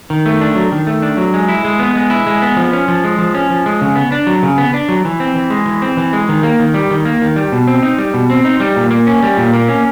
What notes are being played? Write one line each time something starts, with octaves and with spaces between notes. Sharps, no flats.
D#3
A3
D4
F#3
D#3
A3
D4
F#3
G#3
E4
G#3
B3
G#3
E4
G#3
B3
F3
C#4
F3
G#3
F3
C#4
F3
G#3
C#3
B3
D4
F#3
C#3
B3
D4
F#3
E3
C4
E3
G#3
E3
C4
E3
G#3
D#3
A#3
D#3
G3
D#3
A#3
D#3
G3
B2
C4
D#4
G3
B2
C4
D#4
G3
A#2
A#3
C#4
G3
A#2
A#3
C#4